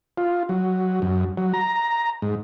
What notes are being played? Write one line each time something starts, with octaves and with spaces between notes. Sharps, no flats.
F4
F#3
F#2
F#3
A#5
G#2